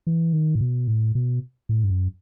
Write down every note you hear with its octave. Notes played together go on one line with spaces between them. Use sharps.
E3
D#3
A2
B2
A2
B2
A2
G2
F#2